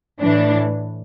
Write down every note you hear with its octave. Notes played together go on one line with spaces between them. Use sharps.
A2 E3 D4